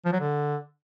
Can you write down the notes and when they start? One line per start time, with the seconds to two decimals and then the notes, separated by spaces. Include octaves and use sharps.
0.05 F3
0.13 F#3
0.20 D3